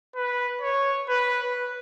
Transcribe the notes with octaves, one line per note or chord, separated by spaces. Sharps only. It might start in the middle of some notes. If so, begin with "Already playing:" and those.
B4
C#5
B4